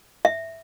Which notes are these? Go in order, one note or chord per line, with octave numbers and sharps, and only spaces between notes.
E5